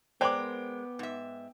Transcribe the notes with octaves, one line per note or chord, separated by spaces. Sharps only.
G#3 B3 A#4 C5 D5 G5 C6 D6
G#2 E5